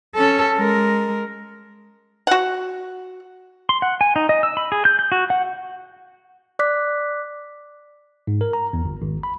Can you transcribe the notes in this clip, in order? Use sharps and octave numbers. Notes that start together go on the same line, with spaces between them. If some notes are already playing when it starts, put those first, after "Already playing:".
C#4 A4
G#3 A#4
F#4 F#5
C6
F#5
G#5
D#4
D#5
E6
B5
G#4
G6
G6
F#4
F#5
D5 D6 F#6 B6
G#2
A#4
A#5
E2
G1
G#1
B5